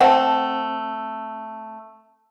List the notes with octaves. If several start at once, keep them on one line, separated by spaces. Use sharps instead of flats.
A3 C4 F#5 A5